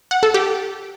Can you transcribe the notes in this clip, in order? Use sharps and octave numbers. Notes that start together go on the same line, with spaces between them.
F#5
A4
G4